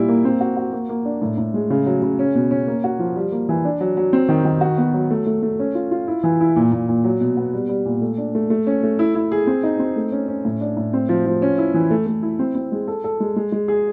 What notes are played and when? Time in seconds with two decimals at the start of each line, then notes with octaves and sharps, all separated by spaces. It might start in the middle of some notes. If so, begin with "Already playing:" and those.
Already playing: A#2 G3 E4
0.09 A#3
0.25 C4
0.41 F#4
0.57 F#4
0.73 A#3
0.89 A#3
1.05 D4
1.22 A2
1.38 A2
1.54 G#3
1.70 C#3
1.86 F#3
2.02 C#3
2.19 C#4
2.35 B2
2.51 C#4
2.67 A#3
2.84 F#4
2.99 F3
3.16 G3
3.32 A#3
3.49 E3
3.65 D4
3.80 F#3
3.97 F#3
4.13 C4
4.29 D#3
4.45 D#3
4.61 F#4
4.78 B3
4.93 F#3
5.10 A3
5.26 A3
5.43 A3
5.59 C#4
5.75 F4
5.91 F4
6.08 E4
6.23 E3
6.40 E4
6.56 A#2
6.72 A#2
6.89 A#2
7.04 F#3
7.21 B2
7.37 B3
7.53 G3
7.69 G3
7.85 A#2
8.01 A3
8.18 D4
8.35 A3
8.50 A3
8.67 C#4
8.83 A3
8.99 E4
9.15 E4
9.32 G#4
9.47 C4
9.63 D#4
9.79 C4
9.96 A3
10.12 C#4
10.28 C#4
10.45 A2
10.61 D4
10.77 A2
10.93 C4
11.09 F3
11.26 F3
11.42 C#4
11.58 E4
11.74 E3
11.91 A3
12.07 A3
12.22 E4
12.39 C4
12.55 C4
12.72 G#3
12.88 A4
13.04 A4
13.20 G#3
13.36 G#3
13.52 G#3
13.68 G#4